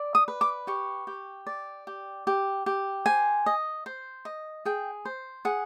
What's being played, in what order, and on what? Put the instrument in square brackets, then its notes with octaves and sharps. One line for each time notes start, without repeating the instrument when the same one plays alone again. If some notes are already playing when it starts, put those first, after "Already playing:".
Already playing: [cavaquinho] D5
D#6
B4
D6
G4 C#6
G4
D5
G4
G4
G4
C5 G#5
D#5
C5
D#5
G#4 G5
C5
G#4 F#5